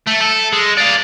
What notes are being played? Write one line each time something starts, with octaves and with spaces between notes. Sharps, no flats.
A3
A4
G#3
D5 F5